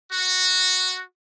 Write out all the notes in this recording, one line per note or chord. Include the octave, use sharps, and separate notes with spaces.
F#4